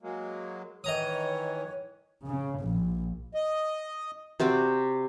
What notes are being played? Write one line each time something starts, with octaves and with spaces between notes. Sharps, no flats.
F#3 G#3 A#3
D#3 E3 C#5 D#5 A#5 D#6
C#3
A#1
D#5
C3 C4 F#4 D5